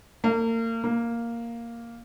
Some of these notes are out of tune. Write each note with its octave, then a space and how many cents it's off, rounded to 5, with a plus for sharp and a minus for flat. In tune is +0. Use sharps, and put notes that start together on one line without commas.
A#3 -35
A#3 +0